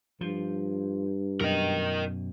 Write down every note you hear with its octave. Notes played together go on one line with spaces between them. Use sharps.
G2 F3
F#2 B2 A#4 D#5